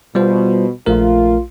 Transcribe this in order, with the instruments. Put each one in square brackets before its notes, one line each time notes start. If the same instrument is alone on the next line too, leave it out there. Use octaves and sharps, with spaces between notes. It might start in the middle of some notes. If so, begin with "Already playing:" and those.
[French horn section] B2 [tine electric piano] G3 F4 C5
[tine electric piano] A#1 A3 A#4 [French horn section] F4